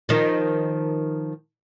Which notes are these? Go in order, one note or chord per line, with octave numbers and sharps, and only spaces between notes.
D#3 F3